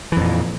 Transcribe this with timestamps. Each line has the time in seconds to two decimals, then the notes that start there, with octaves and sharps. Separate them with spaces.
0.12 E3
0.17 F2
0.21 A#2